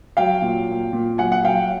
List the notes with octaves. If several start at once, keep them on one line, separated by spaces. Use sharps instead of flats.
F#3 F5 G5
A#2
A#2
A#2
F#3 F#5 G#5
F#5
F#3 F5 G5